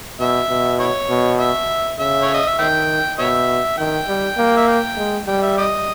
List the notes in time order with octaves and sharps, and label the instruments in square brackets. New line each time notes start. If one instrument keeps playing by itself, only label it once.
[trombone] B2 [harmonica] E5
[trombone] B2
[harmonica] E4 C#5
[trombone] B2
[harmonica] E5
[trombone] C#3 [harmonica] E5
[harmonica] C#5
D#5
E5
[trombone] D#3 [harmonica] E5 G5
[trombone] B2 [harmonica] C#5 E5
[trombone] D#3 [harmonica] G5
[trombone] G3
A#3
[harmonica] E5
G5
[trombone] G#3
[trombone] G3 [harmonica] G5
[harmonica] E5
G4 D#5